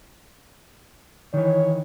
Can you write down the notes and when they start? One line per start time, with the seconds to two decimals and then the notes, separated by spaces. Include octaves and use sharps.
1.34 D#3 E3 C#5